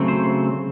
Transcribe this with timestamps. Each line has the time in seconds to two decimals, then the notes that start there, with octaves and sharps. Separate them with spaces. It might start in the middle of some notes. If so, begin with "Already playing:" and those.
Already playing: C#3 F#3 A3 C4
0.08 C5